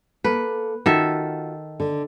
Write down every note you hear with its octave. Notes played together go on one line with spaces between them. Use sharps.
A#3 A4 B4
D#3 F4 F#4 A4 E5
D3